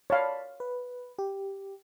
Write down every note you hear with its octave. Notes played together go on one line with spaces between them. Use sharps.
C#5 D5 F5 A5 B5
B4
G4